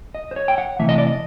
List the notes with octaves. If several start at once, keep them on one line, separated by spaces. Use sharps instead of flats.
D#5
C5
C#5
G5
F#5
C3 E3 A3 E5
D#5
D5
D#5